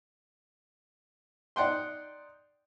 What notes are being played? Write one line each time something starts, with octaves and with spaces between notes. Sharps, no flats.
D#4 D5 F#5 G5 C6